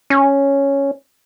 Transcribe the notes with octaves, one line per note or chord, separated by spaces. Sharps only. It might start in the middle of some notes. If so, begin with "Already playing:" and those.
C#4